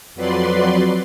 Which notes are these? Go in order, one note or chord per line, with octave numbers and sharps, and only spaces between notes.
F2 F#3 B4 D5 C6